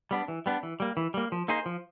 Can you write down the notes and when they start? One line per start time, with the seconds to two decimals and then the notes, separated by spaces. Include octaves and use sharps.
0.11 G3 B3 D4
0.28 E3
0.46 G3 B3 D4
0.63 E3
0.80 G3 A#3
0.97 E3
1.14 G3 A#3
1.32 F3
1.48 A#3 D#4 G#4 C5
1.66 F3